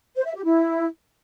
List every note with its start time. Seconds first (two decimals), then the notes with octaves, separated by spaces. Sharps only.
0.16 C5
0.26 E5
0.35 G4
0.44 E4